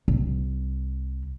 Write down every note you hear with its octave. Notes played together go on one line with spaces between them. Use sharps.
C2